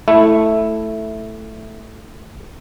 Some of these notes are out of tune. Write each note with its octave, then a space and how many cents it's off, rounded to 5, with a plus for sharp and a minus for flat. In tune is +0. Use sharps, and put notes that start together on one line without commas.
A3 +0 E4 +0